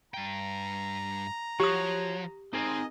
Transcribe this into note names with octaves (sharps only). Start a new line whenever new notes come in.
G2 G5 A#5
F3 F#4 G4 C#5 F#5 D#6
C4 D#4 G#4 A#4 D#5